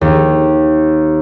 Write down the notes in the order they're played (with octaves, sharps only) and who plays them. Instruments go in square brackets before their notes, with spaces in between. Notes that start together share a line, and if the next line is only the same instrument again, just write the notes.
[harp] D#2